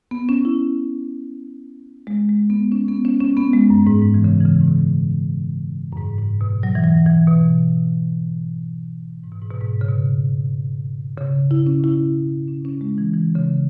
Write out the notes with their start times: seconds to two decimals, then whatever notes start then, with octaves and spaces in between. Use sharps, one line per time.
0.11 B3
0.29 C#4
0.45 E4
2.07 G#3
2.29 G#3
2.50 B3
2.72 C#4
2.88 B3
3.05 C#4
3.20 C#4
3.37 B3
3.53 G#3
3.70 F#2
3.87 G#2
4.02 G#2
4.14 E3
4.24 C#3
4.41 E3
4.46 C#3
4.61 G#2
4.68 B2
5.92 F#2
5.98 G#2
6.19 G#2
6.41 B2
6.63 F#3
6.75 E3
6.84 F#3
7.06 E3
7.27 B2
9.24 G#2
9.32 B2
9.42 G#2
9.51 B2
9.61 G#2
9.81 C#3
9.88 B2
11.18 C#3
11.51 E4
11.67 C#4
11.84 E4
12.48 C#4
12.65 C#4
12.81 G#3
12.98 E3
13.14 E3
13.35 C#3